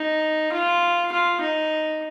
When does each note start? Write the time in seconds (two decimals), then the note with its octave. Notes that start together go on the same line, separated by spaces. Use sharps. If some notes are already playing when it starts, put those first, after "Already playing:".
Already playing: D#4
0.52 F4
1.12 F4
1.41 D#4